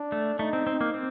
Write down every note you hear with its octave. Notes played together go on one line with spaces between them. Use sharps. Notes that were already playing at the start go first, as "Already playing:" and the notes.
Already playing: D4
A3
A3 D#4
C4
C4
A#3
C4